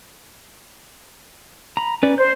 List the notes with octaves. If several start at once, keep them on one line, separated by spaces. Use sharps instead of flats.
A#5 B5
C#4 B4 D5
C5 G6